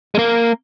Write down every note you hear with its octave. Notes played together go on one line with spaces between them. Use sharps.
G#3
A#3